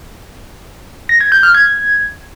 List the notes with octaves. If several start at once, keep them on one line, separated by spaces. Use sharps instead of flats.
A#6
G#6
G6
F6
G#6